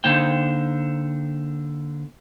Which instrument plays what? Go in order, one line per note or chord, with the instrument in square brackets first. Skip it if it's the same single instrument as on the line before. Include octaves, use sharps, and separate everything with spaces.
[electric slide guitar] D3 A#3 D#4 C5 G5